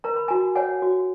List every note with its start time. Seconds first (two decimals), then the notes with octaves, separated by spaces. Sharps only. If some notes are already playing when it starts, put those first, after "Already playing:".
0.04 A#4 A#5
0.16 B5
0.28 F#4 G#5 A#5
0.55 C#5 F#5 G#5
0.82 F#4